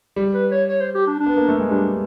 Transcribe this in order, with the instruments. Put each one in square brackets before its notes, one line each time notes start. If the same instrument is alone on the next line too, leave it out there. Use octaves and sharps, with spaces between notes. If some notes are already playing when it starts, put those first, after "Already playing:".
[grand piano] G3
[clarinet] B4
C#5
C#5
C5
G4
D4
D4
[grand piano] B3
A#3
A3
G#3
[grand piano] G3 [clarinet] D4